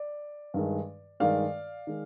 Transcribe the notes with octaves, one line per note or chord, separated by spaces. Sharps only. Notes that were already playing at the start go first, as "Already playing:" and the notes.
Already playing: D5
G2 D#3 G#3
G2 D#3 G#3 D5 F5
D#3 G#3